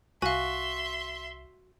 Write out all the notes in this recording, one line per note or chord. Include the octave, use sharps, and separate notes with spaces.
C2 F#4 E5 F5 G#5 C6